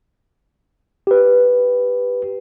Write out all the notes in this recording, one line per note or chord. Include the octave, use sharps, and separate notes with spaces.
G4 B4